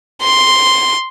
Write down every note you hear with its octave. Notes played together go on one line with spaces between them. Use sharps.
C6